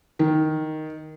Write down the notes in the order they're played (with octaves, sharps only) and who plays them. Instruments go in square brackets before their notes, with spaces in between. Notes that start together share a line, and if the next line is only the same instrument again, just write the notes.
[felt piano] D#3